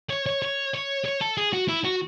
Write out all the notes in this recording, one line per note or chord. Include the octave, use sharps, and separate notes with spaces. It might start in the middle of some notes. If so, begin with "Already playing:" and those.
C#5
C#5
C#5
C#5
C#5
A4
G#4
F#4
E4
F#4